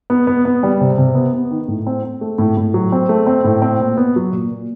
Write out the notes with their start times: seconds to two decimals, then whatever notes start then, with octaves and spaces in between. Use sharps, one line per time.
0.10 B3
0.27 B3
0.45 B3
0.63 G3
0.81 C3
0.98 C3
1.15 B3
1.33 B3
1.51 D#3
1.68 A2
1.87 C4
2.03 C4
2.21 A3
2.38 A2
2.57 A2
2.74 F#3
2.92 C4
3.09 A3
3.27 C4
3.44 A2
3.62 C4
3.80 A#2
3.97 B3
4.16 F#3
4.32 A#2
4.51 A#2